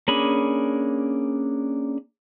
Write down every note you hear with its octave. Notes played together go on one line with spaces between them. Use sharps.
A#3 C#4 D4 G#4 B5